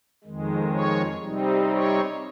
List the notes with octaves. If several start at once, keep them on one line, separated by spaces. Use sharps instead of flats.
F2 D#3 G#3
C#5
C3 G3 C4 D#4
C#5